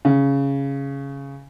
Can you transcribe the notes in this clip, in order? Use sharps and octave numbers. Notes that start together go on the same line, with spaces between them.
C#3